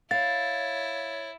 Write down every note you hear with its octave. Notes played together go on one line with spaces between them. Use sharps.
E4 C#5 F5 A6